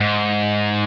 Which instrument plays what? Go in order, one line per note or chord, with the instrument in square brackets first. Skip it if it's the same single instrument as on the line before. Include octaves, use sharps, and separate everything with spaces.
[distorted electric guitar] G#2